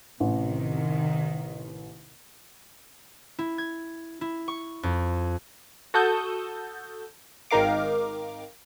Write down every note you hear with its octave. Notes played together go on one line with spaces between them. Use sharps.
A1 C3 D#3
E4
G#6
E4
C#6
F2
F#4 A4 A5 D#6 G6
G#1 D#3 D#4 A#4 F5 D6